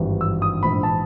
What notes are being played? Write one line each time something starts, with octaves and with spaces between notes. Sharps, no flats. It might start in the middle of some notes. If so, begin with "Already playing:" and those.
Already playing: G#1 G2 E3
E6
D#6
A#1 G#2 E3 B5
A5